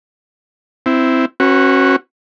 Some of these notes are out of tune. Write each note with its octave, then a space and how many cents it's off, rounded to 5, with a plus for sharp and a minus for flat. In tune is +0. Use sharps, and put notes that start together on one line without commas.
C4 -10 E4 +0
C#4 -35 F#4 +0 B4 +0